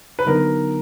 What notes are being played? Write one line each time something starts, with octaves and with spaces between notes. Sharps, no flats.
B4
D3 F#3 B3 D#4 A#4